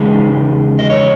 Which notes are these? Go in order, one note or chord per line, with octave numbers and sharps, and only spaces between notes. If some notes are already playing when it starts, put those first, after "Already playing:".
Already playing: E2 C#3 G#3 D#4 G#4
D#5
C#5